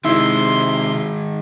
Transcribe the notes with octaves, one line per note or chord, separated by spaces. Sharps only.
C3 D#3 G#3 E4 C6